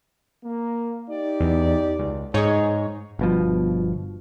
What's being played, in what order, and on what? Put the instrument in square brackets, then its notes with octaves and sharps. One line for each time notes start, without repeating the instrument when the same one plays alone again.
[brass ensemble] A#3
D#4 G4 D5
[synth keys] E2
C#2
[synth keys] G#2 D#4 C#5 [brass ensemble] G#4
[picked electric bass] G1 B2 F3